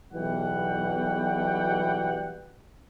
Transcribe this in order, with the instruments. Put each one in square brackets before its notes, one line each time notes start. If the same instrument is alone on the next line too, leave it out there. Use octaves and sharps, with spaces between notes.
[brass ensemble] B1 B2 E3 G3 F#5 G5